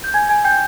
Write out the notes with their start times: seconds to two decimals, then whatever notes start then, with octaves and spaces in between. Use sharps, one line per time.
0.04 G6
0.14 G#5 G#6
0.29 G#5 G#6
0.45 G5 G6